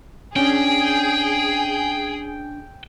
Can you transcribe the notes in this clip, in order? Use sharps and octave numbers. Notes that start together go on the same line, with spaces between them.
C#4 D4 G#4 G5